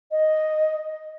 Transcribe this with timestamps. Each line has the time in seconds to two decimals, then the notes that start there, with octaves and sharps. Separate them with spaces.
0.11 D#5